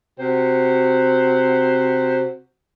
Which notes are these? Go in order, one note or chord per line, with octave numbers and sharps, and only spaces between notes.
C3 F#4 C5 F#5